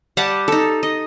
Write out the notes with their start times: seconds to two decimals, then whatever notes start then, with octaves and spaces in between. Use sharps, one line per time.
0.17 G3 G4 F#5 A5
0.48 D#4 A4
0.83 D#5